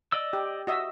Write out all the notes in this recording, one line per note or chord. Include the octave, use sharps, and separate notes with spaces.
D5 D#5 E6
G4
F#4 D#5 E5